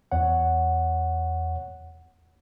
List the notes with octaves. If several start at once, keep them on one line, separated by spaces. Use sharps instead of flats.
E2 C#5 F#5